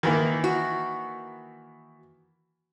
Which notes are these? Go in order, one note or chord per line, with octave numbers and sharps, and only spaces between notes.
D#3 E3 A#3
F#4